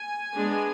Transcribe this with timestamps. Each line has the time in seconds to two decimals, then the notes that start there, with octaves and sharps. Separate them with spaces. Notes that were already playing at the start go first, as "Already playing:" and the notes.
Already playing: G#5
0.33 G#3 B3 D4